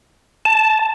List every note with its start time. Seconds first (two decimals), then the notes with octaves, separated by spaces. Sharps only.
0.45 A5